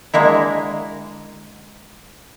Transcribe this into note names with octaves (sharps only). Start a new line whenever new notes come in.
D3 G#3 A#3 E4